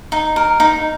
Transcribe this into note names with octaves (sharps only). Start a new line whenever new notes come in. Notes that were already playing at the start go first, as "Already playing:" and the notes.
D#4
A#4
D#4